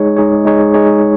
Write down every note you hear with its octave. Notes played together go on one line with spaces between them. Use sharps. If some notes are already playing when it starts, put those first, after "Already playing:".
Already playing: G#3 D#4 G#4 C#5
G#3 D#4 G#4 C#5
G#3 D#4 G#4 C#5
G#3 D#4 G#4 C#5